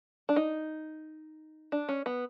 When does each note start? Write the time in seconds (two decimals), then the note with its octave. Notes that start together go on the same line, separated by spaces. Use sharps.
0.29 D4
0.36 D#4
1.72 D4
1.89 C#4
2.06 B3